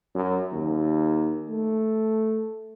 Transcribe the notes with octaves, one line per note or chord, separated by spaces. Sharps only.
F#2
D#2
A3